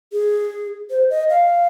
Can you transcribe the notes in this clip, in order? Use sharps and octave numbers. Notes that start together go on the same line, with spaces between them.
G#4
C5
D#5
F5